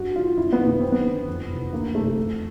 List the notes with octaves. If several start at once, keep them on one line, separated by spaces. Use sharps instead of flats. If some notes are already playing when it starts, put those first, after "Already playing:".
Already playing: G2 F#4
E3 F4
C#2 E4
B3
C3 D#3
B3
F#2 C4
B3
D3
F2
C3 E3
D2 A#3
C3 E3 A3
F2